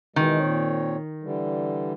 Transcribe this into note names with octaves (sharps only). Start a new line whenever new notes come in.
B2 D#3 E3 G#3
A#2 C4 C#5
D3 E3 G3